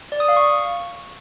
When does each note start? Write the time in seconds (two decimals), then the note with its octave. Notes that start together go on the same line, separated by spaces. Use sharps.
0.12 D5
0.20 D#6
0.28 F5
0.37 C#6